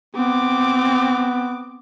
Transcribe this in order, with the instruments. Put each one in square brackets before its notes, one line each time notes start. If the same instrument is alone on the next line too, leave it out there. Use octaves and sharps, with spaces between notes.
[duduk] B3 [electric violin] C4 D6